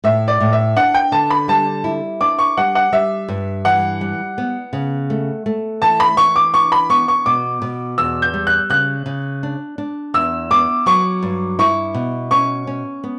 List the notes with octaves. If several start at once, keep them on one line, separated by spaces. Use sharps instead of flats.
A2 E5
D5
A2
E5
D4 F#5
G5
D3 A5
B5
G3 A5
E4
D4 D6
C#6
G3 F#5
F#5
G3 E5
G2
E3 F#5
G3
B3
C#3
A3
A3
E3 A5
B5
E3 C#6
D6
D4 C#6
B5
B3 C#6
C#6
B2 D6
B2
E2 E6
G6
G3
F#6
C#3 F#6
C#3
D4
D4
E2 E6
B3 D6
F#3 C#6
G2
E4 C#6
B2
C#4 C#6
C#4
B3